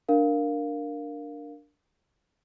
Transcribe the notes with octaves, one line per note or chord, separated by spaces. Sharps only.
D4 A#4 F5